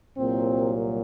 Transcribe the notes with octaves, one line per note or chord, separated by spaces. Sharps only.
C2 A#2 F#3 C4